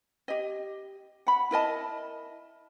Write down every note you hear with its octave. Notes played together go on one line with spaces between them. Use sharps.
G4 D#5
F#5 B5
E4 A#4 D#5 A5